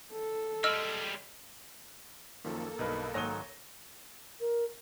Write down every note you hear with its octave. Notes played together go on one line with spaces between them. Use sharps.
A4
G3 G#3 D#5 E6 F6
F#2 D#3 F3 A#3 A4
B1 G2 D#4 A#4 B4
G#2 D#3 F#3 C#5 A#6 D#7 G7
A#4